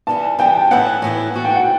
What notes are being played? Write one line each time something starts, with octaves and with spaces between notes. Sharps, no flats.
E3 G3 B3 A5
E3 G3 B3 G5
A2 E3 B3 E4 F#5
A2 E3 B3 E4
E3 B3 F#4 A4
G5
F#5